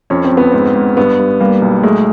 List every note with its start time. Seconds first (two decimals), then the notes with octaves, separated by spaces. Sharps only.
0.10 F2 C#4
0.24 C4
0.32 F2
0.37 B3
0.52 G#2 C4
0.76 G#2
0.97 G2 B3
1.19 G2
1.41 G3 A#3
1.62 B1
1.83 G#3 A3